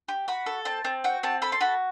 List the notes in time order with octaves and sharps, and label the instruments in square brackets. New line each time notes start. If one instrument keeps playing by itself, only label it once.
[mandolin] G4
F#4 B5
A4
C4 A5
C4
F#4 G5
C4 A5
A4 B5
C6
F#4 B5